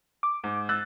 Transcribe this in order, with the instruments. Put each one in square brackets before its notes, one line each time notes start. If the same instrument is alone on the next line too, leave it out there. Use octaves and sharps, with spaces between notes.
[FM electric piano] D6
[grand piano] G#2
[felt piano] E6 F#6 A6